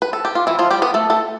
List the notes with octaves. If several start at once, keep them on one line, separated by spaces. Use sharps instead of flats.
B4
A4
G4
F4
E3 E4
F3 F4
G3 G4
B3 B4
A3 A4
A3 A4